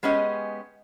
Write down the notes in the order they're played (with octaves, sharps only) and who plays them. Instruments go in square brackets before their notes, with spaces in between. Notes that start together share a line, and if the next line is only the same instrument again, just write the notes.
[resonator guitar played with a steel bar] G#3 B3 C#4 G4 D#5